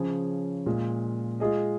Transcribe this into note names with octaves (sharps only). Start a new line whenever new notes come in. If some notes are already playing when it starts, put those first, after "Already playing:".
Already playing: C#3 F3 C#4 G#4
A#2 G#3 F4
G#3 F4 G#4 D#5